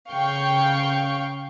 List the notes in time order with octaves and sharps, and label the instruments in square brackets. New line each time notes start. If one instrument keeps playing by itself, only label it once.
[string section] C#3 F5 G5 C#6